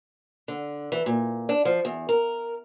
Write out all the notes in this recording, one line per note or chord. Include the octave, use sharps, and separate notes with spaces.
D3
E3
A#2
D4
F3
E2
A#4